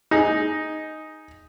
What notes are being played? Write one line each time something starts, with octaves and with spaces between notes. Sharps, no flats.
D#4 G#4